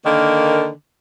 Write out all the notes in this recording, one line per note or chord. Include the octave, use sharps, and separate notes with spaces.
D3 D#3 A#3